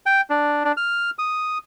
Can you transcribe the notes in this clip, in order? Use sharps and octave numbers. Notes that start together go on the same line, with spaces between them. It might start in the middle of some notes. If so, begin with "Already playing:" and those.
G5
D4
D4
F6
D#6